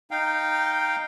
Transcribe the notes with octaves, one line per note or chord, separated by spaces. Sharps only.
D#4 F5 G5